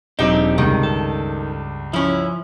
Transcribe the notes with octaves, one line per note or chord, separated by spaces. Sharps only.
E1 F#3 C4 D4 D#4 G4 G7
C#2 G2 C3 D#3
A4
F3 C#4 E4